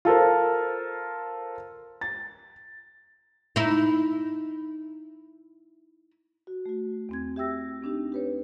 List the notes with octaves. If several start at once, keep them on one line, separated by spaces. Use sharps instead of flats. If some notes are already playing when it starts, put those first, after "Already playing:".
F4 A4 A#4 C5
A6
D#4 E4
F#4
A3 F#4
E2 C4 G#6
G4 E5 G5 E6 A#6
C4 D4 D#4 G4
G4 B4 C#5